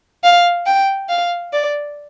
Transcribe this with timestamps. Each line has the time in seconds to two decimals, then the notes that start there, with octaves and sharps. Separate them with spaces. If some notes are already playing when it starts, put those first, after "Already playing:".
0.24 F5
0.66 G5
1.09 F5
1.53 D5